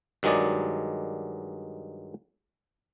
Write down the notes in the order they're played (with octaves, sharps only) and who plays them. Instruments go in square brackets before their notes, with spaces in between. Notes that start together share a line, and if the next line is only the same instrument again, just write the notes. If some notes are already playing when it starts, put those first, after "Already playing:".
[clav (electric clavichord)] G2 D#3 F#3 G#3 G#4 D5